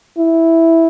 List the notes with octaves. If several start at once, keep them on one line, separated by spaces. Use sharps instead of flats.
E4